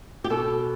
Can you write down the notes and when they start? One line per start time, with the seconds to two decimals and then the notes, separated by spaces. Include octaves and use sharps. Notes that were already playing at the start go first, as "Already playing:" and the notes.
0.24 G4
0.30 B2 A4